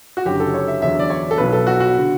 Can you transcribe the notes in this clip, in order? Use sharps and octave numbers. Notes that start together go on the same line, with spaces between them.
F#4
F#1 F#2 D3 F#3 G4
A4
C#5
E5
E2 D3 F#3 E5
D5
C#5
A4
B1 B2 F#3 B4
A4
F#4
F#4
D3